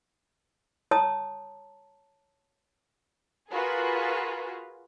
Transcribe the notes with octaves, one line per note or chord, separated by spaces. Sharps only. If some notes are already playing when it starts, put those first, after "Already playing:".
C#5 A5 A#5 D#6
F4 F#4 G#4 A#4 B4